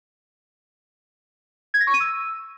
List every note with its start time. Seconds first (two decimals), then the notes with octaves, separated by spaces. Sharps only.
1.74 G#6
1.80 A#6
1.87 C#6
1.94 D#7
2.00 E6